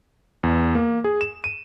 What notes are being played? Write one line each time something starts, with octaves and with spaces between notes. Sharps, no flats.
E2
A#3
G#4
E7
D#7